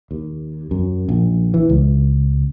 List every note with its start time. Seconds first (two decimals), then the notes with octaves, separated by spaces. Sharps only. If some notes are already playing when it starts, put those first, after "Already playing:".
0.11 D#2
0.71 F#2
1.09 A#1
1.54 E3
1.69 C#2